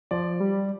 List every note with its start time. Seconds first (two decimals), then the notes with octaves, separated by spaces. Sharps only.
0.11 F3 D5
0.40 G3